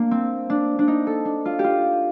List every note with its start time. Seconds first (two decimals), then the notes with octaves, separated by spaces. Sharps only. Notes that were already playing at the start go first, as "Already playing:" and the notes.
Already playing: A#3 D4
0.11 C4
0.50 D4
0.79 D4
0.88 D#4
1.07 A4
1.25 D4
1.45 F4
1.59 G4
1.64 F4